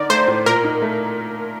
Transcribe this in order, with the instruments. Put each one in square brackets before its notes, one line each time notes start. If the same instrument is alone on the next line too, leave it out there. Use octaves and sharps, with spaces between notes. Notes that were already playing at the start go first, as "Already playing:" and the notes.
Already playing: [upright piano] D3 D#4 A#4 [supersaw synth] D5
[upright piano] A3 [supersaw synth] C5
[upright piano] A2
[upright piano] A#2 [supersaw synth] A#4
[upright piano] D#4
A3